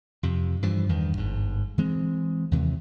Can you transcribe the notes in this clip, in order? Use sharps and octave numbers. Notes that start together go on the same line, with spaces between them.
F2 C3
G2 E3 F3 G3
E2 G2 D#3
G1 G#2
E3 G#3 C4
D#2 C3 E3